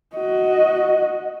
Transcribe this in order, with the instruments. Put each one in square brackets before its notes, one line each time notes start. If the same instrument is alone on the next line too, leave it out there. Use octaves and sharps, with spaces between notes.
[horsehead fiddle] F#4 D#5